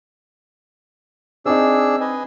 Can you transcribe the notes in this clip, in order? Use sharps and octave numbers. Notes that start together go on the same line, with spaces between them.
C4 D4 D#4 G#4 E6
B4 D#5 G#5